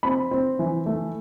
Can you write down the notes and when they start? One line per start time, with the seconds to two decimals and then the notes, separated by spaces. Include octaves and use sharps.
0.03 C4 B5
0.31 C4
0.59 E3
0.86 A3